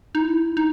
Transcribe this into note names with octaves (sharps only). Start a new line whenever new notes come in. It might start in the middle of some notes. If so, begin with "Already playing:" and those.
D#4
E4
D#4